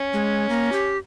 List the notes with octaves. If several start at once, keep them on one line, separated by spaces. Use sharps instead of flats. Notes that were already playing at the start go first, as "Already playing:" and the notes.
Already playing: C#4
G#3
A#3
G4